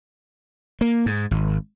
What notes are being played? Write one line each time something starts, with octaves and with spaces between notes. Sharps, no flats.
A#3
G#2
G#1